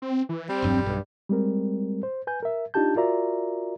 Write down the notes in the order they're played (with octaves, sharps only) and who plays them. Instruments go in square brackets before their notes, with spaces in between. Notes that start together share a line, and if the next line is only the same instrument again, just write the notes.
[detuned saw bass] C4
E3
[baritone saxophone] G3 [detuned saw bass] C4
[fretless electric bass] E1 G2 F#3
[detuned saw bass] B1 [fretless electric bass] G2
[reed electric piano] G3 G#3 C4 A#4
C5
B4 G#5 G6
A#4 E5
D4 D#4 F4 G4 A5 G6
F4 F#4 A#4 D5 E5 A#5